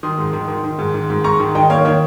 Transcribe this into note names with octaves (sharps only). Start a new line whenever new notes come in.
D#3 C6 D#6
G#2
D#3
D#3
D#3
G#2
D#3
G#2
G#2 A#5 C#6
D#3
D#3 D#5 G5
A#3 C#5 F5
D#3 C#5